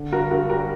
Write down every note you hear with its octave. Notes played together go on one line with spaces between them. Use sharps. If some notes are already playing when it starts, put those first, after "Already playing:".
Already playing: D3
G2 F#4 A#4
G2 F#4 A#4
G3 F#4 A#4